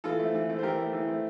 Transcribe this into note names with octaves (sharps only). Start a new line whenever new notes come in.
E3 F4 A4
A3 C4
E3
A3 C4
C5
E3 G4 A#4
A3 C4
E3
A3 C4